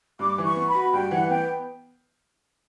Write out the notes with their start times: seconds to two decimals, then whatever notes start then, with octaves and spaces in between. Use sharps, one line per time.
0.19 G2 D6
0.38 E3
0.44 C#6
0.56 B3
0.69 B5
0.75 F#4
0.93 G2 G5
1.11 E3 F#5
1.30 B3 G5